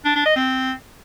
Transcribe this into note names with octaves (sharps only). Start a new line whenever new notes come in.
D4
D4
D#5
C4